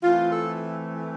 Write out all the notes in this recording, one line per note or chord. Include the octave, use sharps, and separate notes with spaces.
E3 A3 C4 F4
A4